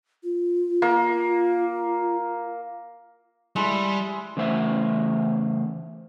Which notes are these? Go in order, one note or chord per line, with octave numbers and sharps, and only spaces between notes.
F4
A#3
G3 G#3 E4
C#3 E3 A3 C5 E5